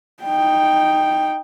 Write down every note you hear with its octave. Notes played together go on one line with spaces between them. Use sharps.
D#4 G5